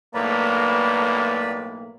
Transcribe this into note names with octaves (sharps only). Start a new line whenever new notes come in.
B1 A2 A#3 B4 D5